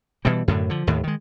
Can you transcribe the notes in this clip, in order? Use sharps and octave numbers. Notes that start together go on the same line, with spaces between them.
B2 E3 G3
F#2 A2 D3
D3 F3
D#2 A2 D#3
D#3 G#3